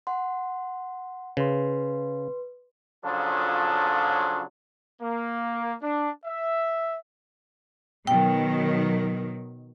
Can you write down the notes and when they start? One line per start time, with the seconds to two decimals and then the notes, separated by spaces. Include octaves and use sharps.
0.07 F#5 C6
1.37 C#3 B4 C6
3.05 C#3 F3 F#3 D4 F4 A4
5.02 A#3
5.82 D4
6.26 E5
8.07 B2 D#3 F#3 G5